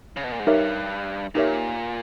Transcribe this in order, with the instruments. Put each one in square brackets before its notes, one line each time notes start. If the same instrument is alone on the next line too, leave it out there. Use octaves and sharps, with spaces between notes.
[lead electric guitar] C#3
B2
A#2
G#2
[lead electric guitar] G2 [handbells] D#4 G4 A#4 C#5 E5
[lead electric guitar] A#2 [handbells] D#4 G4 A#4 C#5 E5